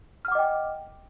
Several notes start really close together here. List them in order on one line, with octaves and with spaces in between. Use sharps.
F6 F#5 D6 D#5 G5